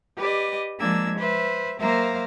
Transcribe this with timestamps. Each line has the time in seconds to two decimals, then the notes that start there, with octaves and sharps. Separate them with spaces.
0.17 G4 B4 D5 D#5
0.79 F3 G#3 A#3 D4 E6 G#6
1.18 B4 C5 E5
1.80 F#3 A#3 A#4 C5 E5 F5